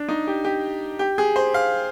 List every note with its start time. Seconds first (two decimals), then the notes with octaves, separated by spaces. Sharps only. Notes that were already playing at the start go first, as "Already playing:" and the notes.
Already playing: D4
0.09 D#4
0.27 G4
0.44 G4
0.99 G4
1.18 G#4
1.36 C5
1.54 F5